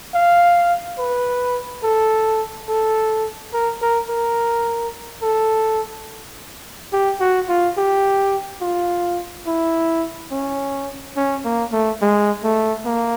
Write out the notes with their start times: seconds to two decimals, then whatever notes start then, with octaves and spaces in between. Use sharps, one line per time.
0.14 F5
0.99 B4
1.83 A4
2.69 A4
3.53 A#4
3.82 A#4
4.09 A#4
5.22 A4
6.93 G4
7.20 F#4
7.49 F4
7.77 G4
8.62 F4
9.47 E4
10.31 C#4
11.16 C#4
11.45 A#3
11.72 A3
12.01 G#3
12.44 A3
12.86 A#3